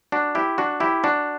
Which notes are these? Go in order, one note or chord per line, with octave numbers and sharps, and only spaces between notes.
D4 F#4
E4 G4
D4 F#4
E4 G4
D4 F#4